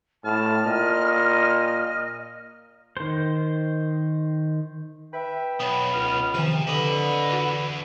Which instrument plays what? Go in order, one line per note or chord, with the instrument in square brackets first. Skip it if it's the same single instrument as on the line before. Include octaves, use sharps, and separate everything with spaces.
[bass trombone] A2 [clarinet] A5 [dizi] F6
[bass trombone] A#2 [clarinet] D#5
[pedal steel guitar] D#3 C5
[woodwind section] B4 E5 G5
[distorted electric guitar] B1 [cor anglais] B3 [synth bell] C#5 B5 D#6
[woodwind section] C#2 F6
[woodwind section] C3 [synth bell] D#3 D#7 [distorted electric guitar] F3
[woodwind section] D3 [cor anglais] B4 [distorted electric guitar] D#5 B5 [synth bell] D6 D#6
[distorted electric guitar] E2 [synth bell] F#4 F#5